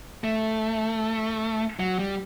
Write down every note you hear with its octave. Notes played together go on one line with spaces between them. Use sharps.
A3
F#3
G3